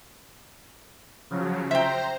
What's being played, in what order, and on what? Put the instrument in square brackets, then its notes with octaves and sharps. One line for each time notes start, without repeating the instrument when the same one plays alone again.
[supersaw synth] C#3 F3 F#3
[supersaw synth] C5 A#5 [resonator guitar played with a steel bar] E5 G5